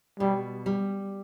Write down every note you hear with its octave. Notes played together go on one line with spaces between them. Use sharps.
B2 G3
G3